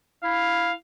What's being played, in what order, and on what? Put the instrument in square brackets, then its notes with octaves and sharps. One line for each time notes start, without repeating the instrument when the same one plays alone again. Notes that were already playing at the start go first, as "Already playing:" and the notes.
[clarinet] E4 [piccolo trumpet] F5